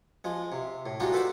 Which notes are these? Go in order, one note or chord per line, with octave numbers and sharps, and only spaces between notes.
F3 G#3
C3
A2
G3 G#3 D4 D#4 F4 F#4
A4 B4 C5 D5 A5 B5